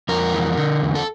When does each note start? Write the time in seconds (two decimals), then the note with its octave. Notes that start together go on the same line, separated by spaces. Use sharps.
0.09 F2 A#4
0.33 E3
0.57 D3
0.82 E2
0.95 A4